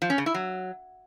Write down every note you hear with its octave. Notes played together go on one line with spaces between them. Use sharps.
F3
C#4
C#3
E4
F#3